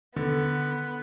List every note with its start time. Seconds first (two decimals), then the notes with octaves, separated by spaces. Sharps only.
0.16 D3 B3